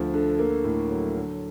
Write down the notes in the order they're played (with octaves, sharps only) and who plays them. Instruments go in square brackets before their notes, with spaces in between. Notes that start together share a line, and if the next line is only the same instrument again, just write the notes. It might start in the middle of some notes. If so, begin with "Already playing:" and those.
Already playing: [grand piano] D2 F3
D3
A#3
A2
F#3
D3